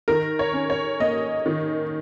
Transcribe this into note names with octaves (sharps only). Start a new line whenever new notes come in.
D#3 A#4
C#5
C#4
C#5
A#3 D#5
D#3